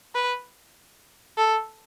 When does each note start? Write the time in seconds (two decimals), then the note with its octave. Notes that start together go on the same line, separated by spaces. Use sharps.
0.15 B4
1.37 A4